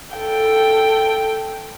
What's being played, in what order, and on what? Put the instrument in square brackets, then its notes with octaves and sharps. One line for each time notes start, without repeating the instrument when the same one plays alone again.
[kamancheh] A4 G5